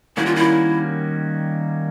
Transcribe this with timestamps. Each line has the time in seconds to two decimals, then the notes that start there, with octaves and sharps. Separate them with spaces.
0.17 D#3 G3 A#3 C#4 E4 F#4
0.26 F4
0.36 E4